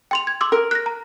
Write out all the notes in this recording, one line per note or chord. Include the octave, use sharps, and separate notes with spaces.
G5 C6 F7
G#6
C6 D6 E6
A#4
F#6 A#6
A#5